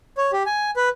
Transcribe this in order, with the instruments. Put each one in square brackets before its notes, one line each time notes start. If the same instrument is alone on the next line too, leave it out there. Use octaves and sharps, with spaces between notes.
[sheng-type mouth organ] C#5
G4
G#5
B4